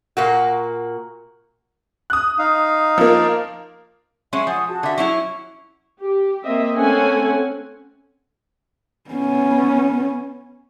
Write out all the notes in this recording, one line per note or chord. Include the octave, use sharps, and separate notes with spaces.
A#2 A#3 F#4
D#6 F#6
D#4 F5
F3 A#3
F#3 G#3 C#4 E5
F3 F#5 G#5 D#6
F#4 G#4 A5
D3 E5
F#3 C#4 E4
G4
A#3 C4 D#5 E5
A3 C4 C#4 A4 F#5 G#5
B3 C#4